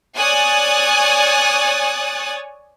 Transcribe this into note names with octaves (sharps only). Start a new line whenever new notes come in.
C#5 D5 G#5 D#6 F#6 A6